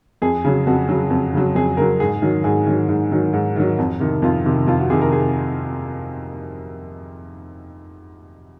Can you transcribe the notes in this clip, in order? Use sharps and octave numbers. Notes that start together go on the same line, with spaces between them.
F2 G#4
C#3 F#3
F2 F#4
C#3 F#3
F2
C#3 F#3
F2 G#4
C#3 F#3 A#4
G#2 G#4
D#3 F#3
G#2 G#4
D#3 F#3
G#2
D#3 F#3
G#2
D#3 F#3
F2
C3 D#3
F2 F4
C3 D#3
F2 F4
F#4
C3 D#3 G#4
A#4
G#4